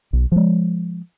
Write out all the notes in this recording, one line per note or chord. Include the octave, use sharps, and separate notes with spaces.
B1
F3 G#3